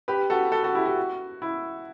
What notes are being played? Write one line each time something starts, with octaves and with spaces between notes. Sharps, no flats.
G4 B4
F#4 A4
F#4 A4
F#4 A4
E4 G4
F#4
E4